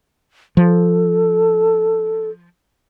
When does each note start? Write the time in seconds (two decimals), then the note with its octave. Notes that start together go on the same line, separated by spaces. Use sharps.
0.57 F3 A4